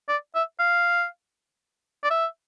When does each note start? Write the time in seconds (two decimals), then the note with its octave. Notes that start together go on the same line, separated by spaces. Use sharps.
0.09 D5
0.35 E5
0.59 F5
2.04 D5
2.10 E5